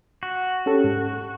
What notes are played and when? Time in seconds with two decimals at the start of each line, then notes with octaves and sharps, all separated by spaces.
0.23 F#4
0.66 C#4 G4 A4
0.84 G#2